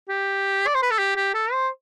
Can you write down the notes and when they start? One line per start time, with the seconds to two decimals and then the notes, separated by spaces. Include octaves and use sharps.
0.09 G4
0.67 D5
0.75 C5
0.83 B4
0.91 A4
0.99 G4
1.16 G4
1.34 A4
1.52 C5